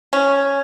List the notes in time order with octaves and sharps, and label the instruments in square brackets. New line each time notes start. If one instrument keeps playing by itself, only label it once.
[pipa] C#4